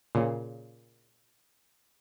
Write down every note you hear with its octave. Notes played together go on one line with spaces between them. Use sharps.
A#2 C#3